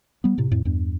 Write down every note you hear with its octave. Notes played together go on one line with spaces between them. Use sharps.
G3 B3
A2 C3
F2 A2
E2 G2